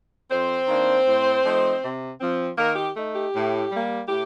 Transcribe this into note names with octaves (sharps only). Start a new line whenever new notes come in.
F2 C4 C5
D#3 A#3 D4
A2
F3 A3 D#4
C3
F3 C4
D#3 A#3 A#4
G4
A3 D#4
G4
A2
G3 A#3
A2 G4